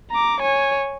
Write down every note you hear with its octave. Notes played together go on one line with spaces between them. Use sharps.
A#5 D6
C#5 G#5